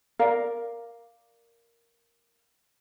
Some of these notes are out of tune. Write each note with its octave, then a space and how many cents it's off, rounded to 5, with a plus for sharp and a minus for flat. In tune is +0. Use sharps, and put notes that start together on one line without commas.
A#4 +0 D5 +0 F5 +0